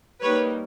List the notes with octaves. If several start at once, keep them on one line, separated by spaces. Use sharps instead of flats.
G3 A#3 D#4 B4 C#5